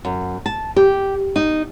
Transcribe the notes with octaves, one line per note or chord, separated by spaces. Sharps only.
F#2
A5
G4
D#4